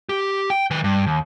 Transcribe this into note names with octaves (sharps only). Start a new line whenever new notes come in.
G4
G5
D#3 B4
G2
D#2